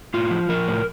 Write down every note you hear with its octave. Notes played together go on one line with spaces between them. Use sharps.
A2 F4
F3
F3 A#4
A2